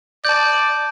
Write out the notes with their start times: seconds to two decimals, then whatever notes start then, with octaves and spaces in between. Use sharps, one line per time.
0.25 D5 A5 G6